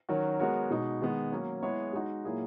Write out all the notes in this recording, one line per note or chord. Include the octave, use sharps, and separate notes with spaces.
D#3 F#3 C#4 F#4 A#4
G#3 B3 F#4 A#4 C#5
B2 G#3 D#4
D#3 G#3 B3
F#3 A#3 C#4
G#3 B3 E4 G#4 C#5
G#3 D#4 F#4
A#2 F#3 A#3 E4 G#4